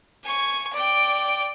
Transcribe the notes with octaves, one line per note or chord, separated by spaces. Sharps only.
G#5 C#6
D5 G5